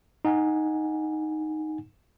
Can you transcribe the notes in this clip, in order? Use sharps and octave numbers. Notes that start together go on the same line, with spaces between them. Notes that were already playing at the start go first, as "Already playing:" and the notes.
D#4 F#5 G#5